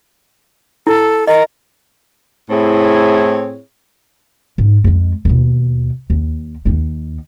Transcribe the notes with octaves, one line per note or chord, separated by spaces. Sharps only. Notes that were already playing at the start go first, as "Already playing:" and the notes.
E4 A4
A#4 D#5
A2 C4 E4 G#4 C#5
G#2
F2 G#3
D#2 B2
D#2
D#2 D#4